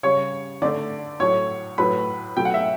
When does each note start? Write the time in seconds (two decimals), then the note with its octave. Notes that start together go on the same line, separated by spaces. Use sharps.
0.03 C#3 G3 C#5 C#6
0.62 D3 A3 D5 D6
1.20 A2 F#3 A3 C#5 C#6
1.78 A2 F#3 A3 B4 B5
2.37 B2 F#3 A3 G5
2.45 F#5
2.54 E5